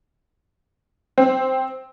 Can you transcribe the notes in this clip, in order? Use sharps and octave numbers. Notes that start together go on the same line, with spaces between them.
C4